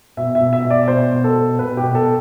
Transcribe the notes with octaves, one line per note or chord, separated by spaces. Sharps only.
B2 E5
E5
B2
E5
B2
D5
B2 C5
B2
A4
B2
B2 B4
G4
B2
A4